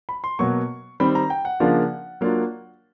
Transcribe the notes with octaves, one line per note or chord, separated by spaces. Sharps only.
B5
C6
B2 F#3 A#3 C#6
D#3 G3 C4 B5
A#5
G5
F#5
C#3 F3 A#3 D4 F4
F#3 A#3 D4 F4